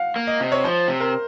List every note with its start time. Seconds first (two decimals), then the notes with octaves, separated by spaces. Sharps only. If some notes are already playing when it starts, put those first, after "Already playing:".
Already playing: F5 F#5
0.16 A#3
0.27 D#5
0.41 C3
0.52 C#5
0.64 F3 C5
0.88 C3
1.00 A#4